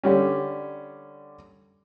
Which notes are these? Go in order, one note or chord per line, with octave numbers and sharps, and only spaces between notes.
D3 G3 C#4